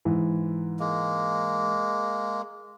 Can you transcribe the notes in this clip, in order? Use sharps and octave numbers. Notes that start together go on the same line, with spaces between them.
G#2 E3
G#3 A#3